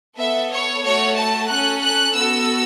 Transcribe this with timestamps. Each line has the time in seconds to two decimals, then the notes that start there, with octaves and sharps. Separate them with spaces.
0.18 B3 A4 E5
0.51 C#5
0.84 A3 F#4 A4 C#5
1.17 A5
1.50 C#4 A4 F#6
1.82 F#6
2.15 B3 F#4 A4 E6